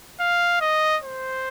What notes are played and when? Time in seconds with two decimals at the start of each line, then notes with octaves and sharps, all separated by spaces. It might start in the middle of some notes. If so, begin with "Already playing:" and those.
0.20 F5
0.61 D#5
1.03 C5